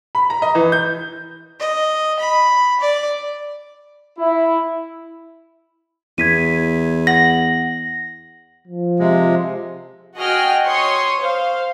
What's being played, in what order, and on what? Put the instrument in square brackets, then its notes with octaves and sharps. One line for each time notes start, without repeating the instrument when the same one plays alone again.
[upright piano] B5
A#5
D#5
E3
G6
[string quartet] D#5
B5
D5
[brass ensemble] E4
[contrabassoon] E2 [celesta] G#6 B6 D#7
[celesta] F#5 F#7 [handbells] A#6
[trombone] F3
[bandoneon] C3 G#3
[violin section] F#4 G#4 D#5 G5 F6
C#5 C6 C#6 D#6
C5 F5